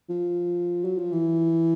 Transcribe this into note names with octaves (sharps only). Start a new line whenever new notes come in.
F3
F#3
F3
E3